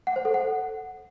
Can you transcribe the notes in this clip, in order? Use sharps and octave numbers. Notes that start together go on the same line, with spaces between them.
F#5
C5
A4
F#5